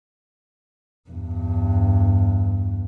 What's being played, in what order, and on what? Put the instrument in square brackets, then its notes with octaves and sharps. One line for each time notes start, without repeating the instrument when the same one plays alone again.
[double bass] E2 G2